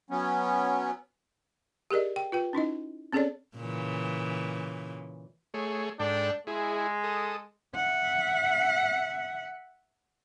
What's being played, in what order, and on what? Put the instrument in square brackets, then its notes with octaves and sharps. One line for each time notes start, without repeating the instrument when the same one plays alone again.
[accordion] F#3 B3 C#4
[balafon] G4 G#4 A#4 D5 D#5
G5
F4 B4 G5
C#4 D#4 E4 D#5
C4 C#4 G#4 A4 C#5 D5
[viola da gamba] A#2 C#3 E3
[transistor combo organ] A3 G#4 C#5
[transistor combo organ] G#2 A4 G5 [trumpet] D4
[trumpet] G#3 [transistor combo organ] E4 G#4
[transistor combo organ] A4 D#6
[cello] E5 F#5